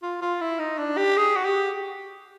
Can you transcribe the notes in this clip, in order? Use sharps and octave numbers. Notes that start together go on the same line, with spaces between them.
F4
F4
E4
D#4
D4
G4
G#4
F#4
G4